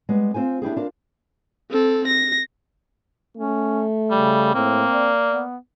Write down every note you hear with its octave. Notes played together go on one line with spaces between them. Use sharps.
G3 G#3 B3
C4 F4 C5 G#5
D4 E4 G4 G#4
D4 F4 A#4
C4 A4
A#6
A3 C#4
C#3 G3
A2 A#3 C4
D5
B3